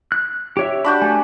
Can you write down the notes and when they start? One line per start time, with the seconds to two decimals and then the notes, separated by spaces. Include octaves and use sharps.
0.12 F#6
0.57 G4 C#5 E5
0.84 D4 F#4 G4 B5
1.02 A3 G#5